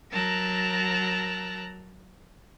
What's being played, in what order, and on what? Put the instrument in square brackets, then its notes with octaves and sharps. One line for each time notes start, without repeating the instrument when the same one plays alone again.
[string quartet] F#3 A#4 A5 A#5 E6 F#6